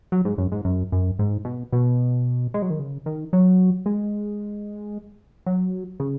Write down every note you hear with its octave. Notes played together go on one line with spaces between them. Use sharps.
F#3
G#2
F#2
G#2
F#2
F#2
G#2
B2
B2
G#3
F#3
D#3
C#3
D#3
F#3
G#3
F#3
C#3